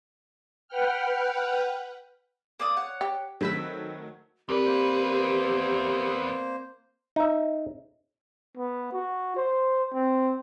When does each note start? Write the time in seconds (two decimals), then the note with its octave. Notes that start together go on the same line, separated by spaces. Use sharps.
0.68 B4 F#5 G5 F6
2.60 A#3 D5 D#6
2.77 C#5 F#5
3.01 G4
3.41 D#3 F#3 A3 C4 B4 E6
4.49 E2 C4 G4 A#4 B4 D5
4.66 A#3 C5
7.16 D#4 E5
8.57 B3
8.93 F#4
9.36 C5
9.94 C4